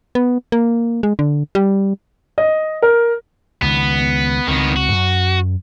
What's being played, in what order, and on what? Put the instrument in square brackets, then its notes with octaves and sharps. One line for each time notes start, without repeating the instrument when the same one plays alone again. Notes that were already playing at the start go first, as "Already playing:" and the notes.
[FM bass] B3
A#3
G#3
D3
G3
[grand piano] D#5
A#4
[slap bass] C#2 D#3 [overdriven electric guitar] B3
[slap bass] C#2 C4 [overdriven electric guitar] D#3 B3
[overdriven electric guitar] F#4
[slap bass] F#2